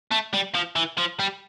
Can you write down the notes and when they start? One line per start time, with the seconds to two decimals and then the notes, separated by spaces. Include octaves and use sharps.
0.11 A3
0.33 G3
0.54 F3
0.76 E3
0.98 F3
1.19 G3